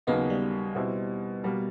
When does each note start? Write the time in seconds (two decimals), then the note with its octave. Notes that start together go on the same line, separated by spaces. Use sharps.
0.07 D#2 C#3 F#3 A#3 B3 D#4
0.30 G3
0.75 B2 G3 C4 E4
1.44 B2 G3 A#3